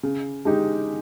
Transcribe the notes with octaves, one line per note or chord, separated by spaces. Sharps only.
C#3
G#3 D#4 G4